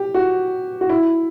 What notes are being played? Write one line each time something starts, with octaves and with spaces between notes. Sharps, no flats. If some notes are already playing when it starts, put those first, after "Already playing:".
Already playing: G4
F#4
F#4
E4